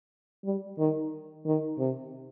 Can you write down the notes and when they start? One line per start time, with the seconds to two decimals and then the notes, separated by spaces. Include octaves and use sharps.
0.45 G3
0.79 D#3
1.46 D#3
1.79 C3